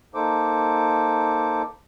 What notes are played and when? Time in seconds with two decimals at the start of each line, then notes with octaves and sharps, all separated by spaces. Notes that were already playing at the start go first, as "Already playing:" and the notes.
0.15 A#3 D#4 A4 C5 D6